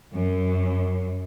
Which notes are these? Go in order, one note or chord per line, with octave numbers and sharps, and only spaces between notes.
F#2